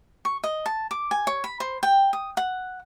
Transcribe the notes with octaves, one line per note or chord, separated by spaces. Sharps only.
C#6
D#5
A5
D6
G#5
C#5
B5
C5
G5
D#6
F#5